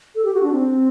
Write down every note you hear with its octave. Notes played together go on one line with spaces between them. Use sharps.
A4
G4
F#4
D4
C4